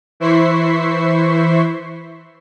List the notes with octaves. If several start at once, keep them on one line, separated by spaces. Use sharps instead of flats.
E3 E4 C5 C#6 B6 C7